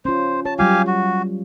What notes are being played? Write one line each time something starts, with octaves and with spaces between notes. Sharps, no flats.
C#4 F4 C5
C#5 A5
F#3 G3 F4 G4 F5 G#5
F#4